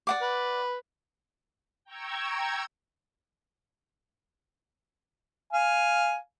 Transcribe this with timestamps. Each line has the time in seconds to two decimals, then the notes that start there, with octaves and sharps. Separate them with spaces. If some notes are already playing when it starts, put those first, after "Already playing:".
0.07 D5 F#5 D6
0.22 B4
1.84 G5 A#5 C#6 E6 G#6
5.53 F5 G#5